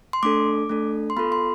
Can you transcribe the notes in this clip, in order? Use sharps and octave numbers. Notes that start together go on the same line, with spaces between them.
C6
A3 D4 A4 D6
A3 D4 A4
C6
B3 F4 A4 B5
C6